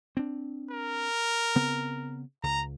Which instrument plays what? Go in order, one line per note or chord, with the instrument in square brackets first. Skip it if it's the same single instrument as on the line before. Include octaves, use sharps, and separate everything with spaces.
[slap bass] C4 D4
[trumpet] A#4
[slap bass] C#3 B3 C4
[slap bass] C#2 [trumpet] A#5